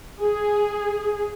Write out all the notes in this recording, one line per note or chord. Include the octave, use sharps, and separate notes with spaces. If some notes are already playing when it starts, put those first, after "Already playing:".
G#4